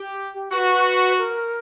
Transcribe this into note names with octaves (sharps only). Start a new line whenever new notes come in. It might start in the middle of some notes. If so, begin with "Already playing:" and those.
Already playing: G4
G4
F#4 B4
A#4